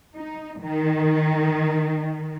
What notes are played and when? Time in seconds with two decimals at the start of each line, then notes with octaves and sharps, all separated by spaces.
0.15 D#4
0.60 D#3